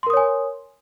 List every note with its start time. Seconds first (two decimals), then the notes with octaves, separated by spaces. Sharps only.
0.03 C6
0.07 A#4
0.10 D#6
0.13 C#5
0.17 G#5